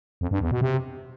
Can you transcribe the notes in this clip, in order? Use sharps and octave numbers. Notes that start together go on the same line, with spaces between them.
F2
G2
E2
B2
C3